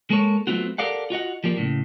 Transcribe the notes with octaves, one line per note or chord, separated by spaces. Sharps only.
G#3 A#3 A4 C#5
F#3 A3 B3 C4 F4 F#4
G4 A4 A#4 D5 F5 F#5
F4 F#4 D#5 F#5
F3 G3 A#3
A2 C#3